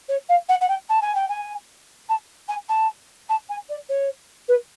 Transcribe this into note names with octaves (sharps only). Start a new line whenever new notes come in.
C#5
F5
F#5
F#5
G5
A5
G#5
G5
G#5
A5
G#5
A5
A5
G#5
D5
C#5
B4